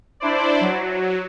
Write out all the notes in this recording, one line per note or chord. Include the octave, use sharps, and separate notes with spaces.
D4 E4 C5 D5
F#3